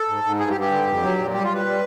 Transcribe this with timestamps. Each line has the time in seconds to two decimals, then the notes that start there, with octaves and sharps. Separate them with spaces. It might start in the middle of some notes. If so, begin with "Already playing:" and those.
Already playing: A4
0.08 G#2
0.24 G#2
0.40 G2 G#4
0.50 G4
0.55 G2
0.61 G4
0.71 D3
0.87 F2
1.02 F#3
1.18 A#2
1.34 G3 G4
1.44 F4
1.50 G3 B4
1.65 G3